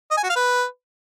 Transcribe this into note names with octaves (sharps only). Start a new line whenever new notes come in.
D#5
G#5
F#4
F5
B4